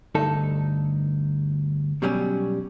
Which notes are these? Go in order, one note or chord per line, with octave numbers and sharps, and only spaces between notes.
D2 G2 D#4 A4
B2 F#3 G3 C#4